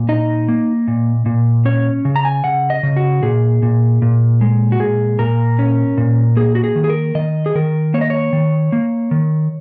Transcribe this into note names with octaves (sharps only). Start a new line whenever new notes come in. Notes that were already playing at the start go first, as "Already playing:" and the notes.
Already playing: A#2
D#4 D#5
A#3
A#2
A#2
C#4 C#5
C#3
A#5
G#5
C#3 F#5
D#5
C#3
F#4
A#2 G#4
A#2
A#2
G#3
F#4
A#2 G#4
A#2 A#4
C#4
A#2
A#3 G#4
F#4
G#4
D#3
G#4
A#4
D#3 D#5
G#4
D#3 A#4
A#3 C#5
D#5
C#5
D#3
A#3
D#3